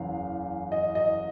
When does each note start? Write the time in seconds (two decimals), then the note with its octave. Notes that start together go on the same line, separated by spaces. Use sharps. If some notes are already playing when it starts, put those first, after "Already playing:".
Already playing: F#1 E2 C#3 E3 F5
0.72 D#5
0.95 D#5